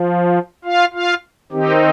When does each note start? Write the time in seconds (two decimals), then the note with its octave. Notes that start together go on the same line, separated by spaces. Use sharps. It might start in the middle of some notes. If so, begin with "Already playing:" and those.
Already playing: F3
0.65 F4 F5
0.94 F4 F5
1.52 D#3 C4 D#4 G4